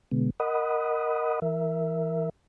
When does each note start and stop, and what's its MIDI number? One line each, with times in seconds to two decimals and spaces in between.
0.12 0.30 47
0.12 0.30 50
0.12 0.30 56
0.12 0.30 59
0.40 1.40 70
0.40 1.40 75
0.40 1.40 78
0.40 1.40 83
0.40 1.40 87
1.42 2.29 52
1.42 2.29 70
1.42 2.29 76